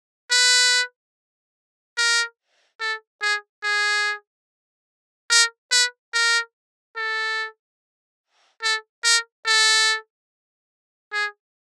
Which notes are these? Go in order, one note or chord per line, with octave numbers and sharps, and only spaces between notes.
B4
A#4
A4
G#4
G#4
A#4
B4
A#4
A4
A4
A#4
A4
G#4